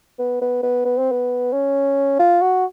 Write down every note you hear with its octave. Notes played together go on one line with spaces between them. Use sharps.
B3
B3
B3
B3
C4
B3
C#4
F4
F#4